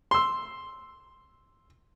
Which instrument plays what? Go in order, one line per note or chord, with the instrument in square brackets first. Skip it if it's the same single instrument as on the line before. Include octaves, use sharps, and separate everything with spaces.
[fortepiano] C6 E6